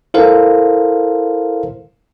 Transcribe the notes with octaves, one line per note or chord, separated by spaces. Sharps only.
E4 A4 A#4 C5 F5